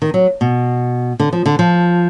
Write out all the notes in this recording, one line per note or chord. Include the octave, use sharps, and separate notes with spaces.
D#3
F#3
B2
D3
F3
D3
F3